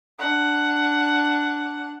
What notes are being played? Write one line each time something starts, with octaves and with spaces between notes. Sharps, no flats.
D4 F#5